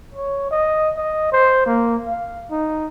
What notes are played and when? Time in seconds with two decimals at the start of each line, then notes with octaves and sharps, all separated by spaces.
0.13 C#5
0.51 D#5
0.96 D#5
1.32 C5
1.66 A#3
2.05 F5
2.51 D#4